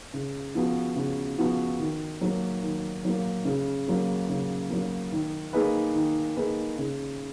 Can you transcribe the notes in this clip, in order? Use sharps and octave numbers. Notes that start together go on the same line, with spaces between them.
C#3
F3 B3 F#4
C#3
F3 B3 F#4
D#3
F#3 A#3
D#3
F#3 A#3
C#3
F#3 A#3
C#3
F#3 A#3
D#3
A#3 D#4 G#4 B4
D#3
A#3 D#4 G#4 B4
C#3